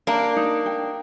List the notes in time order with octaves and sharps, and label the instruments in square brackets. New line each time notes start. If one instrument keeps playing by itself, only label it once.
[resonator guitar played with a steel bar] A#3 D4 [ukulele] A#5
[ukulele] D#4
G5